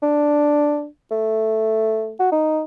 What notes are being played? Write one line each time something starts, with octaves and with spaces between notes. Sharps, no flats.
D4
A3
F#4
D#4